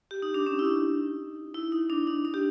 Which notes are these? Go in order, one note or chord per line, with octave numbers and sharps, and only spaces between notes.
G4
D#4
D4
C#4
E4
D#4
E4
D#4
D4
D#4
D4
G4